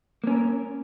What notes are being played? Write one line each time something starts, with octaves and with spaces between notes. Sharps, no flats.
A#3 C#4 A#4